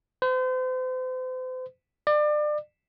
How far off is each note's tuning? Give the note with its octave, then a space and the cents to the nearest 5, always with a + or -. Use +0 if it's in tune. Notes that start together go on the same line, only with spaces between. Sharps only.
C5 -40
D5 +30